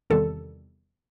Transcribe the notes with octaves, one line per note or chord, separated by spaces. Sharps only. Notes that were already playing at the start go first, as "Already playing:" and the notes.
E2 C3 D#3 G3 A4